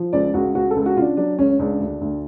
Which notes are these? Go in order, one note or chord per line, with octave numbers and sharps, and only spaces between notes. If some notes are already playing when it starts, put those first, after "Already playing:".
Already playing: F3
C#2 D5
C#2 F#4
C#2 F#4
A4
C#2
F#4
C#3 D4 F4
F#3 D4
C#2 C#4
C#2 D4
D2
D2